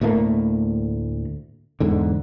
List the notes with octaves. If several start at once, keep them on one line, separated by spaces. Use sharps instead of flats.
D2 A2 A3 A#3
E2 G#2 D3